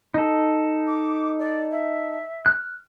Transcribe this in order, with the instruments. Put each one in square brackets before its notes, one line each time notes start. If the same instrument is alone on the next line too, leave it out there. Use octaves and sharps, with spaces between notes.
[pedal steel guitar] D#4 A4
[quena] D6
D5
E5
[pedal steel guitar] F6 F#6